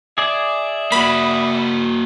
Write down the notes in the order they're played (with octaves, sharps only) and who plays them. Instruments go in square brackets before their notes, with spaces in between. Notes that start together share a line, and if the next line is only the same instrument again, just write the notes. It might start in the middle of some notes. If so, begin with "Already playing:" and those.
[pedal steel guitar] G#4 D5 G#5 [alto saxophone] E5
[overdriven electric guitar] A#3 F#4 [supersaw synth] B5